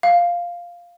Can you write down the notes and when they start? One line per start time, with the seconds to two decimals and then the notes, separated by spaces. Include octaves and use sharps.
0.03 F5